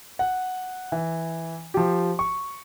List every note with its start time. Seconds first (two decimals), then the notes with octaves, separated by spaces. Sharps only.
0.19 F#5
0.92 E3
1.74 F3 G4
2.19 C#6